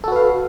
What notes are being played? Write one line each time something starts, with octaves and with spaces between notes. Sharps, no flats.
F#4 A4 B4 F5